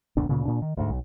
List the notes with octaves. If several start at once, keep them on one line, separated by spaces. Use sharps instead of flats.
F#1 D2 B2 D4
D2 A#2 C#3
A#2 D4
D#3
D2 G#2
B1